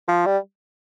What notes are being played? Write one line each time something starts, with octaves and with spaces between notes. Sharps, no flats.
F3
G3